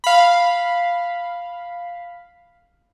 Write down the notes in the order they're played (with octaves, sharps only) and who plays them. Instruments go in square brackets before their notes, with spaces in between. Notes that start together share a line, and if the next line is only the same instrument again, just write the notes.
[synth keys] F5 B5